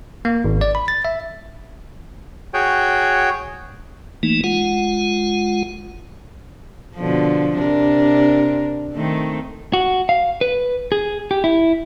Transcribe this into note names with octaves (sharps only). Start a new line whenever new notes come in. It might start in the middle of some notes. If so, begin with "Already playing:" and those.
A#3
G#1
D5
B5
A6
E5
F#4 G#4 C#5 G5
E3 A3 A#3 D#4
G#3 F4 F#5
B2 D3 F3
C3 D4 A#4
D#3 A3 C4
F#4
F5
B4
G#4
G4
E4